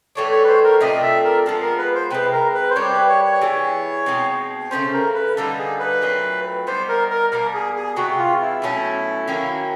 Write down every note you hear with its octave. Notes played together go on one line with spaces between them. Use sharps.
A2 E3 A3 D4 C#5
C#5
B4
C5
A#4
C3 F3 A3 D4 D#5
E5
A#4
F3 G#3 B3 A4
A#4
B4
C5
C3 F3 G#3 B4
A#4
B4
C5
G3 A#3 D4 G4 C#5
B4
C#5
C#5
E3 G#3 B3 E4
B2 G#3 C4 D#4
C#3 E3 A3 C#4 C5
A#4
B4
D3 G3 A#3 D#4 A4
G#4
B4
A#2 F#3 A3 C4
G3 B3 D#4 C5
A#4
A#4
B2 G3 A#3 A#4
G#4
G#4
C3 E3 G#3 B3 F#4
F#4
F4
E4
B2 F#3 A3 C#4
D#3 F#3 A#3 C#4